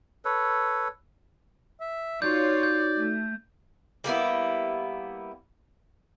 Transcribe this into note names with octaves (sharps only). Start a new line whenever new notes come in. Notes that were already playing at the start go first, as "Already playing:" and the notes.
A4 B4 C#5
E5
D#4 F4 F#4 C#5 D5 G6
G6
A3
G3 A#3 B3 E4